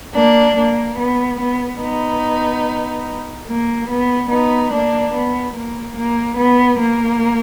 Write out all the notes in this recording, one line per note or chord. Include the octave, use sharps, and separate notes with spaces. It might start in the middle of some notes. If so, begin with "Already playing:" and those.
A#3 D4
A#3
B3
B3
B3 D#4
A#3
B3
B3 D#4
A#3 D4
B3
A#3
A#3
B3
A#3